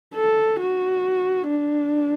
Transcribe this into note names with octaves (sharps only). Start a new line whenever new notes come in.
A4
F#4
D4